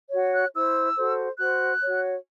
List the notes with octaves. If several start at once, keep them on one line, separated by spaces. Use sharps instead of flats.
F#4 C#5
F#6
E4 C5 E6
F#4 A4 C5
F#4 C5 F#6
F#4 C#5